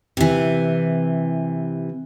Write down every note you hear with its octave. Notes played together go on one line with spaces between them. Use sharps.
C3 E3